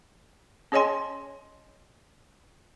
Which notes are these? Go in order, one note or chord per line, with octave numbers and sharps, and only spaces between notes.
C#4 G#4 C#5 D#5 G#5 C6